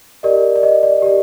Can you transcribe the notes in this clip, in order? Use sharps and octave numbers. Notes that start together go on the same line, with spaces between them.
G4 A#4 D5 D#5
D5
D#5
D5
G4 A#4 D5